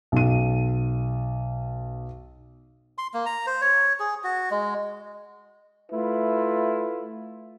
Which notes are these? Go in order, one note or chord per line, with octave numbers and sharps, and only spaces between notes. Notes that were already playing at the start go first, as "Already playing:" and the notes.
B1 D#7
C6
A#3
A#5
C5
C#5
G#4
F#4
G#3
A3 E4 F4 B4